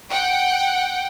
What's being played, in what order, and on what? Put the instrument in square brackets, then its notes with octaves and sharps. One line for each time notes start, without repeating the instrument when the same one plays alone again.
[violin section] F#5 G5